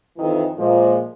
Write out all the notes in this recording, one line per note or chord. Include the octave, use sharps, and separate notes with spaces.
F2 D#3 E3
A#2 F3 G#3 A#3 C5